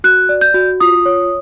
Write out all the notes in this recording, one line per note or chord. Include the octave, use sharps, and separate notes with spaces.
F#4 F#6
D5
G6
F#4
F4 D#6
C#5